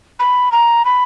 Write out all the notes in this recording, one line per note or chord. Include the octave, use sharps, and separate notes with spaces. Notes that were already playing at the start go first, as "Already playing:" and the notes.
B5
A#5
B5